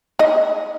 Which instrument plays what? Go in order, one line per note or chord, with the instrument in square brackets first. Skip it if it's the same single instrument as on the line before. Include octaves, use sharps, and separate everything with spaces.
[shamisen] D#4 D#5